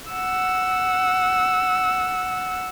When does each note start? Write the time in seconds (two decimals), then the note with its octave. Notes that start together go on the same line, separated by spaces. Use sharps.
0.12 F#5 E6